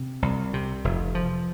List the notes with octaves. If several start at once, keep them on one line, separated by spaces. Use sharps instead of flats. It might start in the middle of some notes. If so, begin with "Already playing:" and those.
Already playing: C3
C2
C3
F1
F3